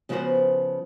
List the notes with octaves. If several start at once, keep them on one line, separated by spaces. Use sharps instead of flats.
C#3 F3 B3 F#4 B4 C5